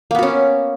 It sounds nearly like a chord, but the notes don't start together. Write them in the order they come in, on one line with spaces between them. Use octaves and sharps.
A#3 B3 F#4 C#4